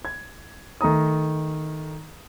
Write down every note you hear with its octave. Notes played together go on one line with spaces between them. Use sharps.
G#6
D#3 A3 A#5 D#6